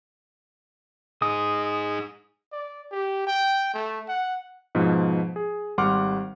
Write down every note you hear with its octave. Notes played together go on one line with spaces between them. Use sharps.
D#4 G#4 D#6
D5
G4
G5
A3
F#5
G#2 B2 F3
G#4
G#1 G3 F#5 C6 D6 F6